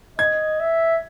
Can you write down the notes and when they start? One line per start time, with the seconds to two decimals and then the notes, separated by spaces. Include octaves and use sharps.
0.19 D#5 G#6
0.60 E5